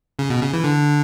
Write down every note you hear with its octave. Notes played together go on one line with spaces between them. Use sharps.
C#3
B2
C#3
E3
D3